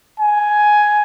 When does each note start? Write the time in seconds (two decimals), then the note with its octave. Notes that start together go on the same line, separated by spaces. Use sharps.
0.20 G#5